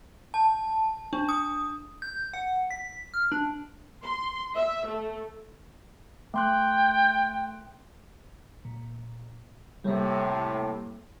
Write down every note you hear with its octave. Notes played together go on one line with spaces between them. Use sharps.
A5
D4
D#6
G6
F#5
B6
F6
D4
C6
E5
A3
A3 G5 C6 F#6
A#2
A2 C3 G3 A#3